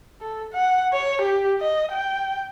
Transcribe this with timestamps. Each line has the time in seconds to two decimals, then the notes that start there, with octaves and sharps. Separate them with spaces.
0.21 A4
0.53 F#5
0.93 C#5
1.21 G4
1.60 D#5
1.92 G5